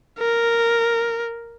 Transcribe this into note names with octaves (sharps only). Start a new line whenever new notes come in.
A#4